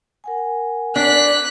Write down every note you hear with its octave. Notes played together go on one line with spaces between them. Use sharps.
A#4 F#5 G#5
D4 D5 F#6 B6